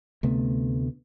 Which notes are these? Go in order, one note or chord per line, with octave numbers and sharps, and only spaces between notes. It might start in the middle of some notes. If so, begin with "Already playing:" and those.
D2 C3 A3 B3